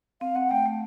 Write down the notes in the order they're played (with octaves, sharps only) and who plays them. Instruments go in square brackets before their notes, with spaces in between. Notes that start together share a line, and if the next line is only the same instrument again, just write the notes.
[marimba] C4 [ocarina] F5
[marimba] C4 [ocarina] F#5
[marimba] A3 [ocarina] G5
[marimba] A3